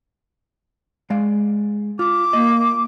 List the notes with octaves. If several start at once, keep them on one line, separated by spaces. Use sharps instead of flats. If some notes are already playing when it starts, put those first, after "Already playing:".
G#3 D5 F5
F4 D6
A#3 D#5